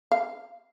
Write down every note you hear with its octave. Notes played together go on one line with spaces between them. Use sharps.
F5